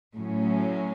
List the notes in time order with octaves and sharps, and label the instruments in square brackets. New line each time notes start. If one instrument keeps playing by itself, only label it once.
[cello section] A2 F#3 C#4